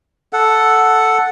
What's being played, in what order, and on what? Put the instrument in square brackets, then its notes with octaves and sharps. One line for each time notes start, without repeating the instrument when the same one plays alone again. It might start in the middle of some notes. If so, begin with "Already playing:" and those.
[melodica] A4 F#5